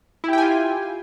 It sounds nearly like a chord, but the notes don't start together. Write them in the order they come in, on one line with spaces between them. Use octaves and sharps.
E4 G4 G5 G#5 F4